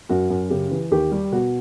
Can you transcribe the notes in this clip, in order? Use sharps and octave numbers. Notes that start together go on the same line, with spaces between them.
F#2 F#4
F#2
C#3 G4
E3
D#2 G4
G3
B2 F#4